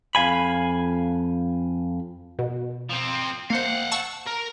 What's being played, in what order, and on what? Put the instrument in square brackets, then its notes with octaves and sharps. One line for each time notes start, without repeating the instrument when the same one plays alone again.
[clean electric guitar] F2 F5 G#5 B5
[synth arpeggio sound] B2
[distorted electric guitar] F3 C4
[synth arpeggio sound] A#3 C5 [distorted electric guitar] F5 F#5
[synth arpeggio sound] A5 C#6 E6
[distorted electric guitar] A#4